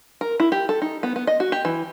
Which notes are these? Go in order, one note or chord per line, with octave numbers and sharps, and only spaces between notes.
A#4
E4
G4
A4
D#4
B3
B3
D#5
F#4
G4
E3